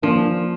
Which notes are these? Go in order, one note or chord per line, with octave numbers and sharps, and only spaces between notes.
F3 A#3 D4